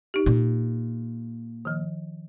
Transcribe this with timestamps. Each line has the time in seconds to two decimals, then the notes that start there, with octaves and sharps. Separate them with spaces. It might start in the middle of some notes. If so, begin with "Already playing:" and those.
0.14 D#4 G4
0.26 A#2
1.65 D#3 F3